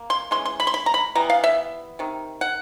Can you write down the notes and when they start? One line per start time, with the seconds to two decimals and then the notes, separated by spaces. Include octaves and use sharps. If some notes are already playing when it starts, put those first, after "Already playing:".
Already playing: A#3
0.10 C6
0.31 E3 G#3 C#4 C6
0.45 C6
0.60 B5
0.67 C6
0.74 B5
0.86 A#5
0.94 B5
1.15 E3 G3 B3 A#5
1.30 F5
1.44 E5
1.99 C3 D#3
2.41 F#5